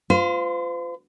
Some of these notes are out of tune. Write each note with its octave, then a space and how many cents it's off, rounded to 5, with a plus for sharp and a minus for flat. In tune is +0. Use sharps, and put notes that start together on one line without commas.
F4 +0 C5 -40